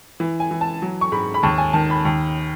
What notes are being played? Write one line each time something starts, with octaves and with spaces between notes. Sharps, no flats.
E3
G#5
E3
A5
F#3
C#6
G#2 B5
B5
D#2 A5
G#5
D#3 A5
B5
D#2